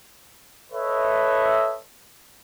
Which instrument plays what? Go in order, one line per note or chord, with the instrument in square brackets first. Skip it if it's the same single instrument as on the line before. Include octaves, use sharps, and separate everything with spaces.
[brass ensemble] A4 B4 C#5 D#5 E5